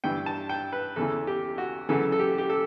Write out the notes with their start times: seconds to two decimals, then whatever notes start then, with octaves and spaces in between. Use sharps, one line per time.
0.04 G2 E3 G5
0.26 A5
0.49 G5
0.73 B4
0.96 E2 C#3 E3 A4
1.27 G4
1.58 F#4
1.89 F#2 C#3 E3 A4
2.12 A4
2.20 G4
2.38 G4
2.50 A4